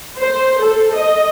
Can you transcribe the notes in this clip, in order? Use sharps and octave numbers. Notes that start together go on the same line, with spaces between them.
C5
A4
D#5